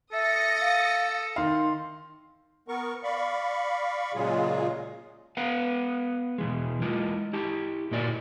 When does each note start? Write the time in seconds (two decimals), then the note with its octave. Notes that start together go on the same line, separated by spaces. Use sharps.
0.13 A4 E5 D#6 A#6 C#7
0.61 F5
1.36 D#3 F5 C6
2.68 B3 A#4 C#6
3.03 D5 F5 B5 C#6
4.14 A#2 C#3 F#3 G#3 F4 G#4
5.37 B3 B4 F5 F#5
6.38 B2 E3 G#3
6.82 G#3 E4 F4
7.33 E4 G4 A5
7.91 A#2 A#3 E4 F#4 D5